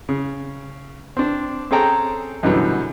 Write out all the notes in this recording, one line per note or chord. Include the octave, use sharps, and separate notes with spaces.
C#3
C4 D4
C4 C#4 G#4 A4 G5 A#5
F#2 B2 D3 E3 F#3 G3